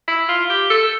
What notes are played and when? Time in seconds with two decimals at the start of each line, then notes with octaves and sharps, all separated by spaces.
0.08 E4
0.29 F4
0.50 G4
0.70 A4